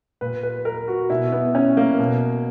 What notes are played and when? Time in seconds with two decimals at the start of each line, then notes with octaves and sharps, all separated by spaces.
0.21 A#2 B4
0.43 B4
0.65 A#4
0.88 F#4
1.10 B2 E4
1.32 B3
1.55 C#4
1.77 A#3
1.99 B2